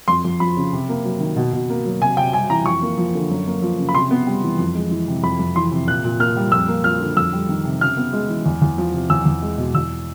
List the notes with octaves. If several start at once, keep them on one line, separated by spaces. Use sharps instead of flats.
F2 C6
F2
F3 B5
C#3
C3
A#3
F#3
D#3
B2
B2
A#3
F#3
C3 G#5
C3 G5
G3 G#5
E3 A#5
F2 C#6
A#3
F3
D3
F#2
A#3
F3
C#3
B5
C3 C6
B3
G3
E3
F2
G#3
E3
C3
F2 B5
F2
E3 C6
C3
A#2 F#6
A#2
A#3 F6
G3
F2 E6
A#3
F3 F6
D3
F2 E6
G3
D#3
C3
C#3 F6
B3
G#3
E3
E2
E2
F3
C3
E2 E6
E2
G#3
B2
E2 E6